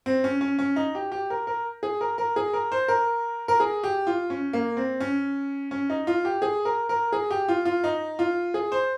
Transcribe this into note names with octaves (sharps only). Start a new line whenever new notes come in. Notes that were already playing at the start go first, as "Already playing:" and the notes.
C4
C#4
C#4
C#4
D#4
G4
G4
A#4
A#4
G#4
A#4
A#4
G#4
A#4
C5
A#4
A#4
G#4
G4
F4
C#4
A#3
C4
C#4
C#4
D#4
F4
G4
G#4
A#4
A#4
G#4
G4
F4
F4
D#4
F4
G#4
C5